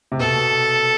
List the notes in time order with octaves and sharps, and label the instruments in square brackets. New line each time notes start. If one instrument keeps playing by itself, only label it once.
[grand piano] C3
[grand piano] B2 [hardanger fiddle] A4